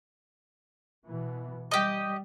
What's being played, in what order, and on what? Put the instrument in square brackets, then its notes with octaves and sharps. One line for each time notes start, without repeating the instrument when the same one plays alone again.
[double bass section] B2 E3
[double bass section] G3 [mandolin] G4 D#5